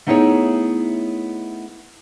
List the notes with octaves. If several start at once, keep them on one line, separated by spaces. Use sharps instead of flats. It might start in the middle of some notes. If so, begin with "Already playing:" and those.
A3 B3 D#4 E4 G#4 C#5